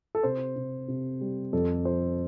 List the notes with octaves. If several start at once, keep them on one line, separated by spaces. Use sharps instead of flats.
A4
C3 C5
C3
C3
G3
F2 A4
F3 C5